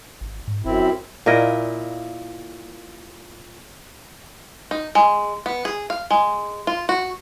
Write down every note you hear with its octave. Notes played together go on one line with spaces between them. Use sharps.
G#1
G#2
G1 F#2 C4 E4
A#2 E4 A#4 D#5
D#4
G#3
B3
G#4
F5
G#3
F4
F#4